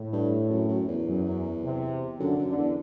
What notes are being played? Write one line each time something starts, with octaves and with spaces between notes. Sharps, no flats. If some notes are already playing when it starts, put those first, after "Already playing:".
Already playing: A2
G2
F#2
F#2
E2
F#2
C3
F#2 D3
F#2
D3
E2